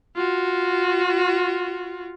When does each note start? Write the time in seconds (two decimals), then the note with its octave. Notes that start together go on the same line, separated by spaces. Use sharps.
0.16 F4 F#4